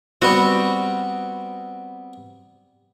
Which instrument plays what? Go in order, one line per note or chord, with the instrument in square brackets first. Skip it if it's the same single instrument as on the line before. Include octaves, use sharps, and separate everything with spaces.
[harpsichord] G3 B3 C4 [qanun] F#4